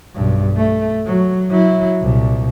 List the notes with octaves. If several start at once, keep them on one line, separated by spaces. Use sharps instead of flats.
B1 G2
A3
F#3
F#3 E4
C2 A#2